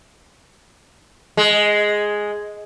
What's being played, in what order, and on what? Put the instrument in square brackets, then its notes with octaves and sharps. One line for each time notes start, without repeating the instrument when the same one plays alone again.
[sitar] G#3